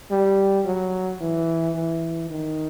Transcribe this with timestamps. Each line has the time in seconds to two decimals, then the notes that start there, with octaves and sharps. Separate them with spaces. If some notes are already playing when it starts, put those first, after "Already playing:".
0.11 G3
0.65 F#3
1.20 E3
1.75 E3
2.30 D#3